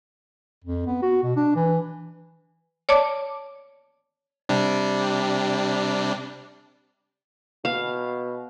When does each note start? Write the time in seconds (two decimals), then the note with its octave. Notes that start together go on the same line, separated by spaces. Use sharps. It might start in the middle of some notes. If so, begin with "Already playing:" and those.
0.64 F2
0.87 B3
1.02 F#4
1.23 B2
1.36 D4
1.56 E3
2.89 C#5 D5 A5 D6
4.49 C3 G3 D4
7.65 B2 F5